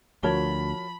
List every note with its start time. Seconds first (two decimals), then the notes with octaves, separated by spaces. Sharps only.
0.23 D2 F3 F#4 A#4 C#5 A5 B5 G7